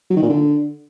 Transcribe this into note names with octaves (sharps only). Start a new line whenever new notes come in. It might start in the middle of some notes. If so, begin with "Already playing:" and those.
F#3
D#3
A#2
D3